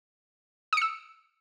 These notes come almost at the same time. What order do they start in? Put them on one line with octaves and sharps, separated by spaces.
D#6 C#7 E6